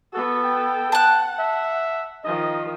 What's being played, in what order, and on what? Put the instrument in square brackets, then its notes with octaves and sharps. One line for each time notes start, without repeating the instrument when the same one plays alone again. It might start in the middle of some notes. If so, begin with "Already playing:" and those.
[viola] B3 A4 [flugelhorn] F#4
[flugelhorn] G5
[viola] F#5 [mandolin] A5 F#6
[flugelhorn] E5
[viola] D#3 F3 [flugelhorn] D#5